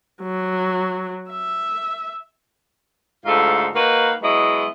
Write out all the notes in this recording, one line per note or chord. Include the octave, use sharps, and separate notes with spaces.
F#3
E5
D2 G#2 F4 A4 E5
A#3 D#4 F#4 B4
F#3 G#3 B3 E4 D#5